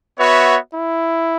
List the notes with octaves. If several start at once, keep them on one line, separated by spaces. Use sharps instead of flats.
B3 F#4 B4 C#5 E5
E4